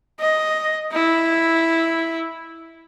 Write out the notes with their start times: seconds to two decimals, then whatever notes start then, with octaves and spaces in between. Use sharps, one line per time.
0.20 D#5
0.92 E4